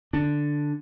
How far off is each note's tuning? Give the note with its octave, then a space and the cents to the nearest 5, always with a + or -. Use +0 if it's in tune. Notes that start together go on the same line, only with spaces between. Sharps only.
D3 +5 D4 +0